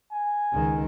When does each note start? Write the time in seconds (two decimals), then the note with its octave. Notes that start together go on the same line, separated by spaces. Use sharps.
0.12 G#5
0.52 C#2 D#3